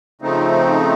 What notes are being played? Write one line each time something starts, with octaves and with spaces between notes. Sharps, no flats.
C#3 F3 A3 C4 D#4